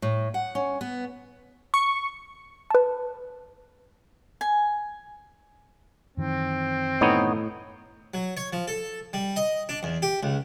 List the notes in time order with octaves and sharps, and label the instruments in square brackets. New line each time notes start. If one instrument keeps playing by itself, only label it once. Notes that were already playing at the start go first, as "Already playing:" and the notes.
[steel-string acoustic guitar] A2
F#5
C#4
B3
[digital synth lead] C#6
[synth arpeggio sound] B4 A5
[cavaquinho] G#5
[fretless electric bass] F#2 D#3 E3 [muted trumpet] C4
[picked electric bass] A2 [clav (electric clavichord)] B3 D#4 C#5
[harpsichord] F#3
C#5
F3
A4
G3
D#5
D4
E2
G4
C#2